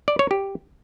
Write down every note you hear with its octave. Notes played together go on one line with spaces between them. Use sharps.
D5
C#5
G4